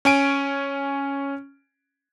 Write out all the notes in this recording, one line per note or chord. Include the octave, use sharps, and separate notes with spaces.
C#4 G#5 D7